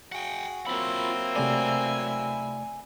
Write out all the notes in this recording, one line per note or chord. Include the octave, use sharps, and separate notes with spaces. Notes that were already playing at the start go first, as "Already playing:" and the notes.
F#4 G#4 F#5 G5
F#3 A#3 C4 E4 F4 B5 E6
C3 A3 D5 G#5